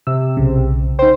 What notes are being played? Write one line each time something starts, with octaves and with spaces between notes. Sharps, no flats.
C3 E6
B1 C#3
D#4 C5 G5